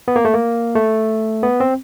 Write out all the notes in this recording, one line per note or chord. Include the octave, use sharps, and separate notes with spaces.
B3
A#3
A3
A#3
A3
B3
C4